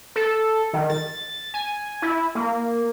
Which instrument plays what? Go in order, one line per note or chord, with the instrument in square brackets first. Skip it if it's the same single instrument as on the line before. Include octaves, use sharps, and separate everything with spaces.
[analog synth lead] A4
D#3
A6
G#5
E4
A#3